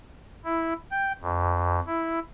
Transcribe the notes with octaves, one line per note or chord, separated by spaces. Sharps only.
E4
G5
F2
E4